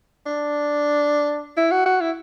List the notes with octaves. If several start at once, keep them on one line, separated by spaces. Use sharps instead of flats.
D4
E4
F#4
F#4
E4